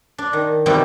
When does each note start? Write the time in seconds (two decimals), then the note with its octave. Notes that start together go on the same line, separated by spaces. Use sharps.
0.18 D4
0.33 D#3
0.66 B2 D#3 E3 G3 C4